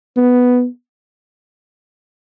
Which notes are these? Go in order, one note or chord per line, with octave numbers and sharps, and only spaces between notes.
B3